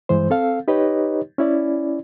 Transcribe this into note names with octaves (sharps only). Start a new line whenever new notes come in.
G2 E3 G#3 C5
C4 A4 F5
D#4 G4 B4 C#5 D#5
C#4 E4 D5